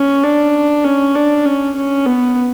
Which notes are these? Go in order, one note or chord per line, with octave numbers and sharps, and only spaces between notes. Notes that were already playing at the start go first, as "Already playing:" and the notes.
Already playing: C#4
D4
C#4
D4
C#4
C#4
B3